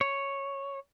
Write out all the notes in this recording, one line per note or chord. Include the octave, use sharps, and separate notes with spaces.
C#5